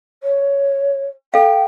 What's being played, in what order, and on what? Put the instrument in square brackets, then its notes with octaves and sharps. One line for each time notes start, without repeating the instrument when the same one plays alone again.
[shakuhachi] C#5
[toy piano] A4 F5 [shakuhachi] G5